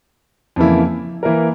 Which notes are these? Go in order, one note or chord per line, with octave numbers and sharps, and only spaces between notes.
F2 C#3 E3 A#3 E4
E3 A#3 E4 A#4